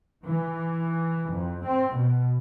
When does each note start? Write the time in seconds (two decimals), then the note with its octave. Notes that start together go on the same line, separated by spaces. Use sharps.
0.24 E3
1.29 F2
1.65 C4
1.94 B2